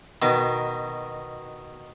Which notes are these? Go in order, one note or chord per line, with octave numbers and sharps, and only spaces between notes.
B2 D#3